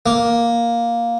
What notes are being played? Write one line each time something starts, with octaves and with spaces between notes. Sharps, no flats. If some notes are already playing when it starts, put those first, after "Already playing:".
A#3